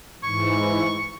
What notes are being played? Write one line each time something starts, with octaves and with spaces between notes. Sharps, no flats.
G#2 E3 C#6